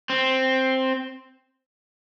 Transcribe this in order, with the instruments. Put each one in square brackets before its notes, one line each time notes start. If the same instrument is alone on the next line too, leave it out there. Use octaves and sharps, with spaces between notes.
[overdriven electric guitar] C4